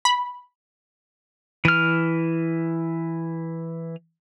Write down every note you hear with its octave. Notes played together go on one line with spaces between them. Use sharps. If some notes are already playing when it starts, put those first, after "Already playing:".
B5
E3 F6